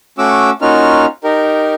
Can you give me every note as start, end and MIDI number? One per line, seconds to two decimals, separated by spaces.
0.18 0.50 57
0.18 0.50 61
0.18 0.50 66
0.18 0.50 86
0.18 0.50 88
0.62 1.05 58
0.62 1.05 61
0.62 1.05 63
0.62 1.05 65
0.62 1.05 66
0.62 1.05 89
1.24 1.74 63
1.24 1.74 67
1.24 1.74 70